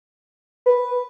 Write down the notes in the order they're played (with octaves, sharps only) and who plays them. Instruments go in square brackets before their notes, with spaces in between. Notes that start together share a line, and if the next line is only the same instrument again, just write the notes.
[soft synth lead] B4